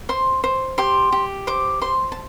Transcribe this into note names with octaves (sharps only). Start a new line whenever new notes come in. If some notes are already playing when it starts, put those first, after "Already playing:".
C5 C6
C5
G4 C6
G4
C5 D6
C5 C6
A5